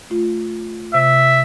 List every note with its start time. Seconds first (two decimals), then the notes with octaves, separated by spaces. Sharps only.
0.10 A3 F4
0.94 C3 E5